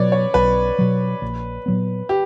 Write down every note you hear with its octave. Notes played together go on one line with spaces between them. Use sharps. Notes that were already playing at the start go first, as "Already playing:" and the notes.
Already playing: B2 F#3 B4 C#5 D5
C#5
B1 B4
B2 F#3
A#1
A#2 F#3 B3
G4